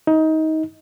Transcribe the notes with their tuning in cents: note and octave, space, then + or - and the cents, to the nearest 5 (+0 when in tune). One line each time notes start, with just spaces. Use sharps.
D#4 +25